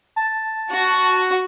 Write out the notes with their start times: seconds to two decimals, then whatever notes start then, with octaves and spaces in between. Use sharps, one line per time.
0.16 A5
0.71 F#4